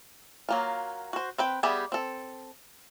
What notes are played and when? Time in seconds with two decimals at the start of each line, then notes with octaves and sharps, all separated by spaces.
0.49 F#3 A#3 F4
1.13 F#4 C5
1.38 C4 B4 G5
1.63 G3 B3 G4 G#4 E5
1.92 C4 A4